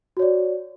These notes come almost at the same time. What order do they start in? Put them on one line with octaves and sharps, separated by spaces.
F#4 C#5 D5